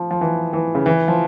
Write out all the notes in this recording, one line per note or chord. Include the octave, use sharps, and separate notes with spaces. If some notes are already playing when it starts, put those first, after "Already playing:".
Already playing: F3
F3
E3
E3
C#3
E3
F3